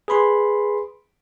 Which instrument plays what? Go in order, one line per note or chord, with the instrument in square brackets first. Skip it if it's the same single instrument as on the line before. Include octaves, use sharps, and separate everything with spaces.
[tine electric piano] G#4 B4 B5 C6